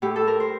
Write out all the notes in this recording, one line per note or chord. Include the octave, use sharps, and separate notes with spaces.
A2 G4
A4
A#4
C5